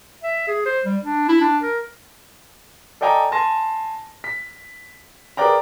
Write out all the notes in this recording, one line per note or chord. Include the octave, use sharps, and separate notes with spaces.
E5
G#4
C5
G3
D4
E4
D4
A#4
A4 D5 D#5 G5 G#5 A#5
G#5 A5 C6 A#6
B6
G#4 A#4 B4 D5 G5 A#5